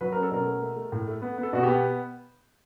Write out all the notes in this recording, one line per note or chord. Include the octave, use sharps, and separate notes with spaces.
F#3 B4
C#4 A#4
A4
B2 A#4
A3
A3
A3
A2
A3
B3
B3
A4
B2 F#4
B3 G4